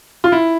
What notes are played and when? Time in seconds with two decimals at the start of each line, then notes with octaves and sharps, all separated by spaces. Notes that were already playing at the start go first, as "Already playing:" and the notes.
0.24 F4
0.32 E4